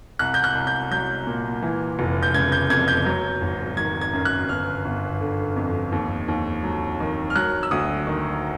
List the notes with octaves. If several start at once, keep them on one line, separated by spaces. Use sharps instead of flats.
C2 F#6
G6
F#6
C2
G6
F#3 G6
A#2
E3
F1
G6
C#3 G#6
G6
F2 G#6
G6
F#3
G#1
D#3 G#6
G#6
F#2
F#6
G1 F6
G1
D3
F2
D#2
D#2
F#3
D#3
F6
F#3 F#6
E6
D2 D#6
D#3